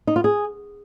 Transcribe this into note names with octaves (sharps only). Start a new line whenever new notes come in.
D#4
F4
G#4